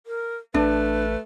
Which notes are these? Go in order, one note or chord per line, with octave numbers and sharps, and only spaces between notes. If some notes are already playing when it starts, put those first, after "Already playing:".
A#4
A1 A3 D4 B4